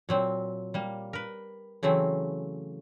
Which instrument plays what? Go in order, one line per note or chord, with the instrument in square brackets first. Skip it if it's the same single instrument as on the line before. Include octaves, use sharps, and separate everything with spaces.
[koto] A#2 F#3 C4
G3 A#3
A#4 B4
C#3 E3 F#3 A3 C4